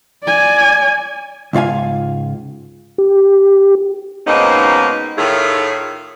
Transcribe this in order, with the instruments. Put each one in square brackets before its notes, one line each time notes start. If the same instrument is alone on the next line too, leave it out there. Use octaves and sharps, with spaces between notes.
[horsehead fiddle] D5 G#5
[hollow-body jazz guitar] C#2 G#2 F4 F5 G#5
[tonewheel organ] G4
[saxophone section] G#2 B2 A#3 C4 C#4 D#4
A2 D#3 A3 F4 G#4 C#5